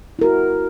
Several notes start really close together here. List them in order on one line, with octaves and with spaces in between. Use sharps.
E4 A#4 F#4